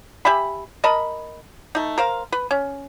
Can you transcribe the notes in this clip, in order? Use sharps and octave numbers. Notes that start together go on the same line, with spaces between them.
G4 E5 G#5 B5
A#4 D#5 A5 B5
A3 D#4
A#4 C5 F5
B4
C#4